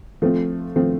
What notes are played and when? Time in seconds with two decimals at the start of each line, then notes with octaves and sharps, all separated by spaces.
0.22 F3 A3 C4
0.76 F3 A3 C4